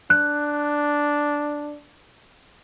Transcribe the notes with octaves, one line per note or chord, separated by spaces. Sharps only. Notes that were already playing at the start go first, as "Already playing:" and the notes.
D4 F#6